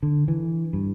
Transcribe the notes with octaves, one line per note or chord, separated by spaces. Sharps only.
D3
E3
G2